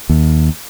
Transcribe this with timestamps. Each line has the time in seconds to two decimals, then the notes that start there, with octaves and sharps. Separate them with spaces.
0.09 D#2